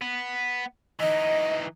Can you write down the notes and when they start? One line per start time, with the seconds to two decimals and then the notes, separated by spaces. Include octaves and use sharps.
0.01 B3
1.00 E3 D#4 D#5